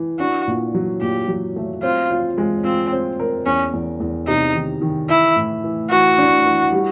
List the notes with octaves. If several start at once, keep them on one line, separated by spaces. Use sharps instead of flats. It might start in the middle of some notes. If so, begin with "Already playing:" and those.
Already playing: E3
D4 F#4
A#2
F#3
A#2 G4
F#3
A3
C4 F4
F4
G#3
C4 F4
C4
A#4
E2 C#4
E2
E2
C3 D#4
D#3
D#3
E3 E4
A2
E3
E3 F#4
D4
E3
G3